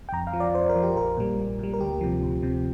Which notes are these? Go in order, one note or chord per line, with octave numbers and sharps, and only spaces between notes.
G5
F2 A#5
F5
F3
D5
F2 C5
A#4
F3
G4
A#1 A#4
A#2 G3
A#1
A#2 G3
A#4
D2 G4
C3 F3
D2
C3 F3